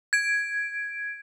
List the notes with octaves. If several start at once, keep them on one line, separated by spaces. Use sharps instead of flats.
G#6 D7